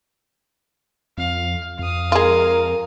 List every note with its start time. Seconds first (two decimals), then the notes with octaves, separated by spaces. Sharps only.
1.18 F2 F5
1.79 F2 F5 D#6
2.12 G#3 F4 A#4